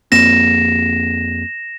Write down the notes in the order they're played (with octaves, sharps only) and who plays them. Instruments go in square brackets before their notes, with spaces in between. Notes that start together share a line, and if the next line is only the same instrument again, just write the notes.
[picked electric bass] F2 A#3 C4 [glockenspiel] A#6 E7